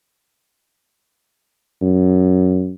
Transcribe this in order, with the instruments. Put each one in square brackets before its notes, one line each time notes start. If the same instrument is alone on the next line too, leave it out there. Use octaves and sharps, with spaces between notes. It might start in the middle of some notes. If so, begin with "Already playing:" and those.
[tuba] F#2